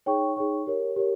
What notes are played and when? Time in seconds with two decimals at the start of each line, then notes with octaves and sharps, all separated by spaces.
0.06 D#4 G#4 C#5 G5 C#6
0.36 D#4 G#4 C#5 G5 C#6
0.67 G4 A#4 C#5
0.96 G4 A#4 C#5